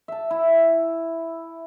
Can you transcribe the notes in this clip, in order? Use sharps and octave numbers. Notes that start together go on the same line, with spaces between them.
E5 A5
E4